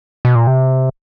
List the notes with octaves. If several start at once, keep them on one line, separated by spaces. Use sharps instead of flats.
B2
A#2
C3